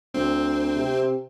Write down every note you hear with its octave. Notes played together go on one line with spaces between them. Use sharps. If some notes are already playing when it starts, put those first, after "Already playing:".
D2 C4
C3